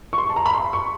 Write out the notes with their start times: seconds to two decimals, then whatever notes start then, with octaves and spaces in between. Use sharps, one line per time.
0.13 C#6
0.18 C6
0.29 A5
0.36 A#5
0.46 B5
0.54 C6
0.73 C#6